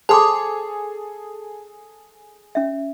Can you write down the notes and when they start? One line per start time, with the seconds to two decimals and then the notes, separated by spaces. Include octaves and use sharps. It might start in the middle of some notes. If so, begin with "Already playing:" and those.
0.09 G#4 A4 C5 A5 C6 D6 D#6
2.55 C#4 E5